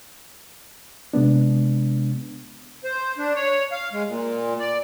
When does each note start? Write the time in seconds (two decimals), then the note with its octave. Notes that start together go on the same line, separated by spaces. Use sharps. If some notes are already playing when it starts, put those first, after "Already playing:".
1.14 C3 G#3 B3 D4
2.84 C5
3.18 D4
3.35 C#5
3.72 F5
3.93 G#3
4.08 A#2
4.59 D5